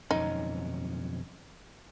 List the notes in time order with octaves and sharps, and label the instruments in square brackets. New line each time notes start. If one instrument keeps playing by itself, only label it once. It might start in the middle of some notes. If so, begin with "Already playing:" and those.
[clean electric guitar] B1 F2 C#4 [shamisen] D#4